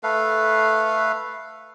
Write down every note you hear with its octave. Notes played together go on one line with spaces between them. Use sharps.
A3 A4 B4 F5